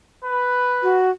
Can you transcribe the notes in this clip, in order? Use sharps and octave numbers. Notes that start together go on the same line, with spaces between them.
B4
F#4